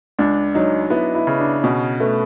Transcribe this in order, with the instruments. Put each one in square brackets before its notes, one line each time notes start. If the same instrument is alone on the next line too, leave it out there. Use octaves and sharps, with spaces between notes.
[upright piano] C#2 [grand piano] D4
[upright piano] F#3 [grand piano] D#4
[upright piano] B3 [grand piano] E4
[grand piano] E4
[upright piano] C#3
[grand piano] D4
[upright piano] B2 [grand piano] C#4
[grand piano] A3 [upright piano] B3